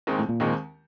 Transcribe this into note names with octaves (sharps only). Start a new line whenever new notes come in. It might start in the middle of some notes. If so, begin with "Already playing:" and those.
D#2 D#3 G#3 C4
A2
A#2
D#2 D#3 G#3 C4